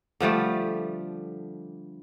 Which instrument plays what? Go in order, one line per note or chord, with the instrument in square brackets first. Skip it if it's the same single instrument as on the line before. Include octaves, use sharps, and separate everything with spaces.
[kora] D3 F3 G3 A3